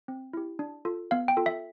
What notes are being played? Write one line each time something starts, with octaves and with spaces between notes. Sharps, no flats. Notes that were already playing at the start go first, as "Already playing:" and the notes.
C4
E4 G4
D4
F4 A4
B3 F5
G5
F4 A4
E5